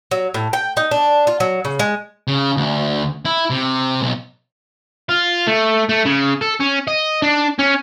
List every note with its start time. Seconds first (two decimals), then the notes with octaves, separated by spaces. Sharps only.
0.11 F#3
0.34 A2
0.53 G5
0.77 D#4
0.91 D4
1.27 F4
1.40 F#3
1.65 C#3
1.79 G#3
2.28 C#3
2.57 D2
3.25 E4
3.50 C3
4.01 B1
5.09 F4
5.47 A3
5.89 A3
6.05 C#3
6.41 A4
6.60 C#4
6.88 D#5
7.22 D4
7.59 C#4